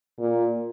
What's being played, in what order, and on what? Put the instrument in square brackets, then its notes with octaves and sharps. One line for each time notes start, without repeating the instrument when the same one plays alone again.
[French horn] A#2